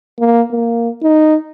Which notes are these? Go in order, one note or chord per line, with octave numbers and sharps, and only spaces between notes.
A#3
A#3
D#4